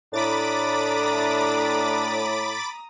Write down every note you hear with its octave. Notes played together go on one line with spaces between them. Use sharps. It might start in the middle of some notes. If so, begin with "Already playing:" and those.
A2 D4 A#5 B5 D6 D#6 A6